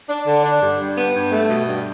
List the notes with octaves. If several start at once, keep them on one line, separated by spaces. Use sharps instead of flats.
D4
D3
D4
G2
G2
B3
G2
A3
B2
G2